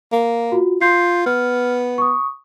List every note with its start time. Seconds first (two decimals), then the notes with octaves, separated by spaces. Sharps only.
0.12 A#3
0.52 F4 F#4
0.81 F4 C6 G6 C7
1.26 B3 F6
1.98 C#6 D#6